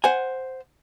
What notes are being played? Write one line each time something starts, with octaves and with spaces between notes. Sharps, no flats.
C5 F#5 G#5